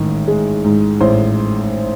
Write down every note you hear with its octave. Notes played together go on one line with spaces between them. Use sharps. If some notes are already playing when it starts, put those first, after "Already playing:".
Already playing: A1 G#2 D#3
G#3
G#2
A1 C5